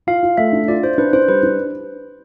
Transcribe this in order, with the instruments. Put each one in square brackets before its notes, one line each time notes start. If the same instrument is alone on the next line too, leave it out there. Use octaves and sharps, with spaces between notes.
[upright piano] F4 [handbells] F5
[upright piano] F4
[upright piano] A3 [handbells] E5
[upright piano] D4
[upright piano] F4 [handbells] D5
[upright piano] F4 [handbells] C5
[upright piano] D4 [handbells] B4
[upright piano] D4 [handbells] C5
[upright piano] G3 [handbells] B4
[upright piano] D4